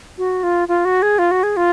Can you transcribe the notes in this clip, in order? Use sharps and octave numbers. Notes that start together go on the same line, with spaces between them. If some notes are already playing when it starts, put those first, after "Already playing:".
F#4
F4
F4
F#4
G#4
F4
F#4
G#4
F4